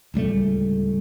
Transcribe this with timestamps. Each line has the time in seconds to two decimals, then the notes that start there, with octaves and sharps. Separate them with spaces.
0.14 D1 C#2 G3 A3